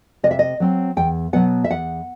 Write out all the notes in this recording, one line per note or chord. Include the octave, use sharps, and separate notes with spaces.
C3 D#5
E5
D#5
F#3 C4
E2 G5
B2 F#3 B3 F#5
E5
E2 F#5